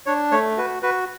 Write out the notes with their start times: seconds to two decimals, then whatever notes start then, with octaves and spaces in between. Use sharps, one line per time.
0.06 D4 C#5
0.32 A3 C#5
0.57 F#4 B4
0.83 F#4 B4